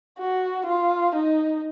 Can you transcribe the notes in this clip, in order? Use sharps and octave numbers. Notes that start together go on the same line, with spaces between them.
F#4
F4
D#4